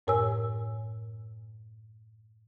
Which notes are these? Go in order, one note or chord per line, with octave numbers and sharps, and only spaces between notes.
F#2 A2 A#4 C#5 G#5 E6